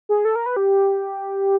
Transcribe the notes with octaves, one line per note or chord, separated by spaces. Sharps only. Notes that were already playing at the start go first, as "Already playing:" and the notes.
G#4
A4
A#4
B4
G4